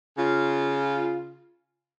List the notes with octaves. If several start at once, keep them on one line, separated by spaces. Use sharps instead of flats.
C#3 F4